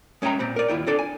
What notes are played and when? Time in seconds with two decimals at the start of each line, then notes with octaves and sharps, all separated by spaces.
0.22 G#3 C#4 E5 G5 A#5 B5
0.39 A#2 C4 B5
0.56 A#4 D5
0.68 D#2 E4 F4 G5
0.87 C4 D4 A4 D5
0.99 G#5